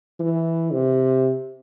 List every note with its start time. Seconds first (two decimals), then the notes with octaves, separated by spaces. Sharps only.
0.19 E3
0.72 C3